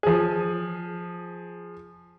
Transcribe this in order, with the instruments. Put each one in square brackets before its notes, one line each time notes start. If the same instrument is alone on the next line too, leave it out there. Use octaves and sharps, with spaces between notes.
[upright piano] F3 G#4